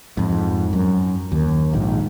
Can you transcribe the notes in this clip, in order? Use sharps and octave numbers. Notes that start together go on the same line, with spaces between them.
F2 G#2
F#2
D#2
A#1 G#2